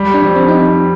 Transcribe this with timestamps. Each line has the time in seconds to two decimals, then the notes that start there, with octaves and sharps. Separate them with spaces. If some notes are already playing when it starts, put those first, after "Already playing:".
Already playing: G3
0.14 D4
0.22 F2
0.36 C4
0.48 D#4